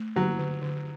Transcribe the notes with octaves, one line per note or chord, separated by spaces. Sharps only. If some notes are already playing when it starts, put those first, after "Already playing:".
Already playing: A3
D3 F#3
D3
D3